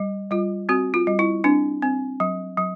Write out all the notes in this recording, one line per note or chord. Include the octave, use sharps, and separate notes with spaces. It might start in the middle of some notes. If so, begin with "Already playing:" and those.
Already playing: G3
G3 F4
C4 F#4
F4
G3
E4
C4 D4
C4
F#3
F#3